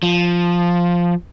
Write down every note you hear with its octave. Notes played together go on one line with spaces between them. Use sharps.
F3